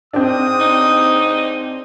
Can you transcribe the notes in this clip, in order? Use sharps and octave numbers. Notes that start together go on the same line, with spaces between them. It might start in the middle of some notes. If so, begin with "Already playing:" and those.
G#2 C4 D4 D#6
D#4